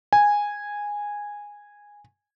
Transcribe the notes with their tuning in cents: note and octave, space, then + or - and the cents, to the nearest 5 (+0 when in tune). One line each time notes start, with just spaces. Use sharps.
G#5 -10